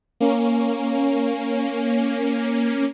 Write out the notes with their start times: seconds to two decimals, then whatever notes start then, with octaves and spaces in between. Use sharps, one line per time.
0.20 A#3 C#4